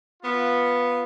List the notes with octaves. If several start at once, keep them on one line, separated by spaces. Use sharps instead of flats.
B3 F4